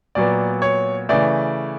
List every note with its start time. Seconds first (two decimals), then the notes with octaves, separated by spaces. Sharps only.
0.15 A#2 F#3 B3 D5
0.62 C#5
1.09 C#3 E3 A3 D5